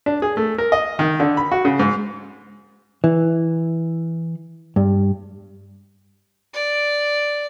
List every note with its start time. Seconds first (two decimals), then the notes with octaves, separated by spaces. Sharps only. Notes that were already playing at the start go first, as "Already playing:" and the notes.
0.06 D4
0.22 G#4
0.37 A3
0.58 A#4
0.72 D#5
0.99 D#3
1.20 D3
1.37 B5
1.52 F#4
1.65 C#3
1.80 G#2
3.04 E3
4.76 G2
6.54 D5